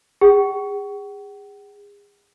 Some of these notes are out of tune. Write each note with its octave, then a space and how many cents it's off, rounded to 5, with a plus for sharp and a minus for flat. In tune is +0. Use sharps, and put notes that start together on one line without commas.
G#4 -30 F#5 +45